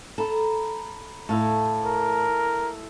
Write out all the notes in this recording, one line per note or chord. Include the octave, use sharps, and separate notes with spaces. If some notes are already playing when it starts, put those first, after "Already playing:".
A4 A#5 B5
A2 A3 E4 F5
A#4